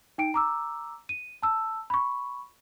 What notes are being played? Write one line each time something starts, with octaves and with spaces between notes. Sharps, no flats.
D#4 G5 D7
A#5 D6 E6
D#7
A5 E6
B5 C#6